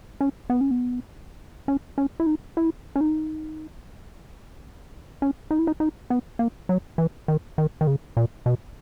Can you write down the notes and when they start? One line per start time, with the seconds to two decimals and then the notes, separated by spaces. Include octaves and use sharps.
0.21 C#4
0.50 B3
0.61 C#4
0.71 B3
1.68 C#4
1.98 C#4
2.20 E4
2.26 D#4
2.57 E4
2.96 C#4
3.01 D#4
5.22 C#4
5.51 D#4
5.59 E4
5.67 D#4
5.80 D#4
6.10 B3
6.39 A#3
6.69 F#3
6.98 E3
7.28 D#3
7.58 D#3
7.81 D#3
7.87 C#3
8.17 A#2
8.46 B2